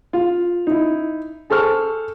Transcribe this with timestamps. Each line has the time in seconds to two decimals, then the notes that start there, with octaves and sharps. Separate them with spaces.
0.13 F4
0.67 D#4 E4
1.50 G#4 A4 C5 C#6 F6